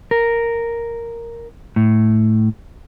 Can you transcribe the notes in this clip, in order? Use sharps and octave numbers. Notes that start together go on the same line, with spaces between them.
A#4
A2